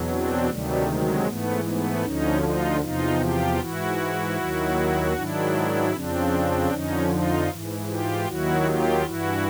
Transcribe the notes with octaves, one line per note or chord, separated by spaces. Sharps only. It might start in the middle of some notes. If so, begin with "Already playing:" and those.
Already playing: E2 B2 F#3
C4 D4
D2 C3 D#3 F#3 G3 A3
F#3 G#3
G#2 E3 A3 B3
A3 B3
D2 D3 F3 C#4 D#4
D#4 F4
E2 C3 F3 D#4 F4
F4 G4
G#2 E3 E4 F#4
D#2 D#3 F#3
G#2 D#3 F#3 D4 E4
F2 C#3 F3 C4 D4
F2 D3 F3 C#4 D#4
D#4 F4
G#2 E3
F4 G4
D#2 D#3 F#3 E4 F#4
F4 G4
G2 E3 E4 F#4